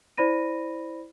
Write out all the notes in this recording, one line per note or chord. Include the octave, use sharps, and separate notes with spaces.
E4 C5 D5 B5 A#6 D#7